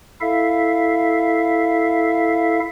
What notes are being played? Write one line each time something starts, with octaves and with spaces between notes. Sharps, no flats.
E4 A4 E5 F5